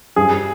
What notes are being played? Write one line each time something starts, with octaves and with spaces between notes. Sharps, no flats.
G2 G#4